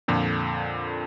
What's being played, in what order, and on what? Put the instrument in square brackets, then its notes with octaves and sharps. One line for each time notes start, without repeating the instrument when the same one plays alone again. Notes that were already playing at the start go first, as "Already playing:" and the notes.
[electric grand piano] F2 A#2 D3